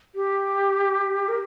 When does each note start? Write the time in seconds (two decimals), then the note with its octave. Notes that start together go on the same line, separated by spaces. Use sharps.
0.15 G4
1.28 A#4